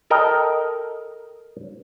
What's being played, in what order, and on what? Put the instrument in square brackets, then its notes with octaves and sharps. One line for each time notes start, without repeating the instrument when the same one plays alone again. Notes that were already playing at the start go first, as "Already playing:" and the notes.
[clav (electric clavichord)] A4 A#4 D#5 G5